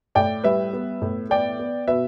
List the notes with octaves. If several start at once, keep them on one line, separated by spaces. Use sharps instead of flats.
A2 D5 G5
G3 B4 E5
B3
A2
B3 D5 G5
B3
B2 B4 E5